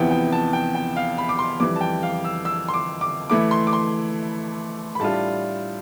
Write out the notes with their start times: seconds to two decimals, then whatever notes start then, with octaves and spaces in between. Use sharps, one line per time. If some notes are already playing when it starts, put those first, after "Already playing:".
Already playing: E2 C3 F3 B3 E4 G5
0.11 G5
0.32 A5
0.53 G5
0.75 G5
0.96 F5
1.18 B5
1.29 D6
1.39 C6
1.60 F2 E3 G3 D6
1.76 A5
1.81 G5
2.03 F5
2.24 E6
2.45 E6
2.69 C6
2.74 D6
3.01 D6
3.30 E3 A3 E4 D6
3.51 C6
3.67 D6
3.73 C6
4.95 B5
5.00 A2 G3 D4 F4 A5